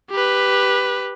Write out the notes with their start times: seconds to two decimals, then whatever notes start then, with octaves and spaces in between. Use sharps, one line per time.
0.11 G4 B4